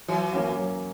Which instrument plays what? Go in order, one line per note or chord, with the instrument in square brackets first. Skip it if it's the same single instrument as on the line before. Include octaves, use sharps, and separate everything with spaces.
[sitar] E3 [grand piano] F#3
[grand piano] A#3 C#4 F#4
F#3